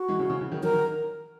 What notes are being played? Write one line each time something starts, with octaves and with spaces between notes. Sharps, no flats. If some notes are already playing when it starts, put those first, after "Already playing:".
Already playing: F#4
E3 G#3
C#3 E3
C#3 E3
C#3 E3
D#3 F#3
D#3 F#3 A#4
D#3 F#3